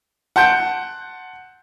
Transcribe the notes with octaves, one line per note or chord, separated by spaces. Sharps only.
F#5 A5 C6 G6 D7